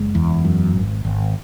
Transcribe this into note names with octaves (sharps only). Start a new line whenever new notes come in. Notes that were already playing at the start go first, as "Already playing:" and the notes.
Already playing: F#1 G#3
E2
F#2
G#1
G#1